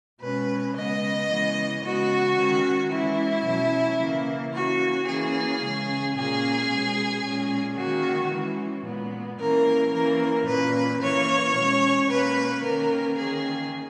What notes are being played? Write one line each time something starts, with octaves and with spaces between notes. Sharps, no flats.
B2 G#3 C#4 B4
C#3 G#3 B3 D#5
C#3 E3 G#3 B3
C#3 G#3 B3 F#4
D#3 G#3 C#4
E3 G#3 C#4 E4
B2 F#3 C#4
C#3 E3 A#3 C#4
E3 A#3 C#4 F#4
E3 A#3 C#4 G#4
C#3 G#3 C#4
A#2 A#3 C#4 G#4
B2 G#3 C#4
A#2 G#3 C#4
D#3 A#3 C#4 F#4
E3 G#3 C#4
A#2 G#3 B3
E3 A#3 C#4 A#4
E3 A#3 C#4 A#4
A#2 A#3 C#4 B4
E3 A#3 C#4 C#5
B2 G#3 C#4
B2 A#3 C#4 B4
D#3 A#3 C#4 A#4
D#3 A#3 C#4 G#4